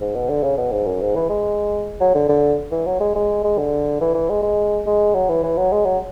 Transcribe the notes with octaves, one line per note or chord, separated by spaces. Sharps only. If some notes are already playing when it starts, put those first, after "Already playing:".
G#2
B2
D3
C#3
B2
G#2
F#2
G#2
E3
G#3
F#3
D3
D3
E3
F#3
G#3
G#3
G#3
D3
E3
E3
G#3
G#3
G#3
F#3
E3
E3
F#3
G#3
F#3